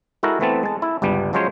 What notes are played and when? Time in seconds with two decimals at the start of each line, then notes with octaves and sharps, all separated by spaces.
0.23 G#3 E4 F#4 A4 A#4
0.40 E3 A3 B3 C4 A5
0.63 G#3 A5
0.82 E4
1.02 G1 C#2 G3 B3 D4
1.33 F3 F#3 G#3 C#4 C5 C#5